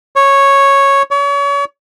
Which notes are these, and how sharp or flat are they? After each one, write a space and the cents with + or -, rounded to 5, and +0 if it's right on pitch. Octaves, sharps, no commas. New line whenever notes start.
C#5 -5
C#5 +35